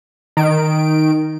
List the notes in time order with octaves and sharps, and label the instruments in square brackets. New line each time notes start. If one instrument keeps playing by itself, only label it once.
[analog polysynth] D#3 D7